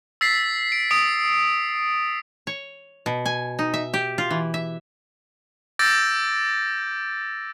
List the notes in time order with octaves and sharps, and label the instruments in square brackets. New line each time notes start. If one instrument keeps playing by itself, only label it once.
[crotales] E6 A6 B6 C7
D7
D#6 D7
[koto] C#5
B2
G#5
D#4
E5
G4
F4
E3
E5
[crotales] D6 E6 G6 A6 A#6 D7